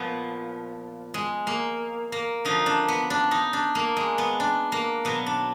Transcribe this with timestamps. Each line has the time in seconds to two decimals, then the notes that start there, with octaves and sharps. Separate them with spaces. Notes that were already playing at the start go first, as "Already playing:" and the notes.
Already playing: A#2 F3 B3
1.14 G#3
1.47 A#3
2.12 A#3
2.45 D3 F3 D#4
2.66 D4
2.88 B3
3.10 D4
3.31 D#4
3.53 D4
3.75 A#3
3.97 G#3
4.18 B3
4.40 D4
4.72 A#3
5.05 B2 F#3 B3
5.26 D4